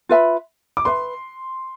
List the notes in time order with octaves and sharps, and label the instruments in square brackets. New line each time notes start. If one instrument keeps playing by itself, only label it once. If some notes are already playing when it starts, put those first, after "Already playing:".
[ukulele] F4 B4 E5 B5
[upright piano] D6
[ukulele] B4 E5 B5 [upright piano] C6